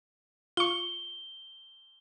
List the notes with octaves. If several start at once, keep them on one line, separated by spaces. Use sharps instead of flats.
F4 C#6 G7